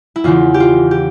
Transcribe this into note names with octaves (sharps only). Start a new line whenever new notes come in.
E4
E2 C#3 E3 F4
G4
F4
G4